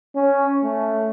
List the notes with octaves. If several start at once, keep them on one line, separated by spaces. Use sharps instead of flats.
C#4
A3